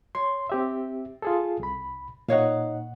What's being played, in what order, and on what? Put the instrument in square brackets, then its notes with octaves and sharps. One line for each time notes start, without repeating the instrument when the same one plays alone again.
[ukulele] C#5 [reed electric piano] C6
[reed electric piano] C4 G4 E5
F4 G#4 A4
C2 B5
[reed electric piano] A#2 F#5 [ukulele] D#4 C#5 F5